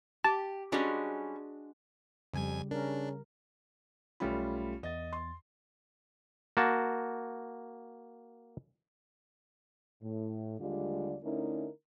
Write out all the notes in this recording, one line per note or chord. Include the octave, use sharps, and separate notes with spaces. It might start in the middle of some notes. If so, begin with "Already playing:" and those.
G4 A5
G3 G#3 C#4 D4 F#4
F2 C#3 G3 G#5 G#6
C#3 D4 A#4
B1 G3 A3 C#4 F4 B5
E2 D#5 A6
C6
A#3 F#4 A5
A2
D#2 D3 G3 G#3 F4 D5
D3 A3 C#4 D#4 E4 A#4